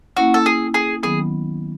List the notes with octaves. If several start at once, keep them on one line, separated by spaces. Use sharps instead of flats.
A#3 C#4 E4 F#4
A4
G#4
G#4
D#3 F#3 B3 G#4